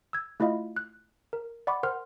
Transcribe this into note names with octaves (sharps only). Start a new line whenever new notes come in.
E6 G#6
A3 E4 F4 D#5 F5 B5
F#6
A#4
D5 F#5 B5 C#6 D6
A#4 C5 F#5 C6 F6